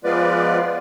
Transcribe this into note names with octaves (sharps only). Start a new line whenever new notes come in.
F3 G#3 B3 F4 B4 D5